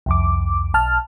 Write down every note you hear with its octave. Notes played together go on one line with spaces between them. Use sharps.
C2 F2 D6
B1 A5 F6